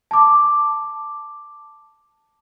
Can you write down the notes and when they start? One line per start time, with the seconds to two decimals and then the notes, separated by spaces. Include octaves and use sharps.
0.11 A5 D6